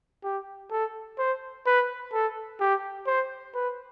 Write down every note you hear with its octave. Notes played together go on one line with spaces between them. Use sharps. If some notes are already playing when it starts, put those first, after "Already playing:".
G4
A4
C5
B4
A4
G4
C5
B4